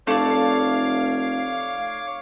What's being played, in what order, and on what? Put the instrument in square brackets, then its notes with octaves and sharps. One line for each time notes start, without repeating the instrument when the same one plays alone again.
[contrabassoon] F1 [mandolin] A3 D5 [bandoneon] C#5 D6 [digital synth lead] F5